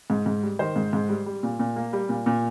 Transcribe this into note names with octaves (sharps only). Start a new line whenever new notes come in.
G#2
G#2
G3
D#3 C5
G#2
G#2
G3
G3
A#2
A#2
A#3
G3
A#2
A#2